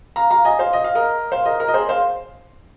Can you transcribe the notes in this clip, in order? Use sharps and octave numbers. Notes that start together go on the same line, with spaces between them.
F5 A#5
F5 A#5
D#5 G#5
C5 F5
D#5
F5
A#4 D#5
C5 F5
A#4 D#5
A#4
D#5
G#4 C5
C5 F5